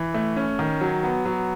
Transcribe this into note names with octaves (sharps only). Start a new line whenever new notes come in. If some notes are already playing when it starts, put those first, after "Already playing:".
Already playing: E3
A3
C#4
D#3
F#3
B3
F#3